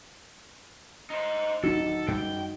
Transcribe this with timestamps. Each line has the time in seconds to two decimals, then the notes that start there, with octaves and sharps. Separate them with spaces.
1.10 D#4 C5
1.64 D1 F#3 D#4 F#4 A4
2.08 F#2 G3 G#3 G5